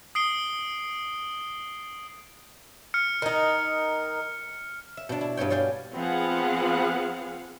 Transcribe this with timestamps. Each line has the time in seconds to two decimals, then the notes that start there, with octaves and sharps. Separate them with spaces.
0.15 D#6 C7 D7 G7
2.94 F6 C#7
3.22 D#3 D#4
4.97 E5
5.09 B2 D4
5.21 E4
5.37 G2 B3 G4 C#5 G5
5.50 C#5 D5 F5 G5 G#5
5.95 F3 B3 C4 G#4 F5 F#5